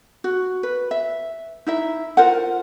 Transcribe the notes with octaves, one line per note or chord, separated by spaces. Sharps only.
F#4
B4
E5
D#4 E4 E5
F4 A#4 C5 F#5